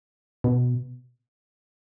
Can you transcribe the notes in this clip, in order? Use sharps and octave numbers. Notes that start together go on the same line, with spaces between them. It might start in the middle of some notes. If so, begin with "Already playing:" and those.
B2